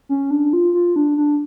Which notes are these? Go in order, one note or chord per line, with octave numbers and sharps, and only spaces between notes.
C#4
D4
F4
F4
D4
D4